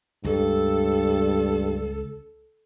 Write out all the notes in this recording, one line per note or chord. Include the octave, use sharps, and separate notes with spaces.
C#2 G2 A4